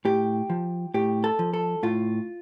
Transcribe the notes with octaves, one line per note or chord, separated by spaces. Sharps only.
A2 G4
F3
A2 G4
A4
F3
A4
A2 F4